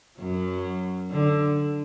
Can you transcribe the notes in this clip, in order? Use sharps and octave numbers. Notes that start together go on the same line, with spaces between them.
F#2 F#3
D3